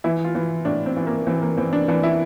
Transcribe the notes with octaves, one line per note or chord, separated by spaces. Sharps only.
E3 E4
F4
E3
A2 D4
C4
E3
A#3
E3 C4
A#3
E3 C4
D4
E3 D4
E4